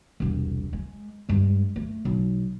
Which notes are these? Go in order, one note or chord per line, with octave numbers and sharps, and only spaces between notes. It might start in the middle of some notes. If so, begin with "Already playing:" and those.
E1 C2
G#3
G2 G#3
A3
B1